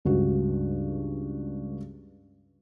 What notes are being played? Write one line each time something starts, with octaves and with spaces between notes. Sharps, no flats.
C#2 G2 F#4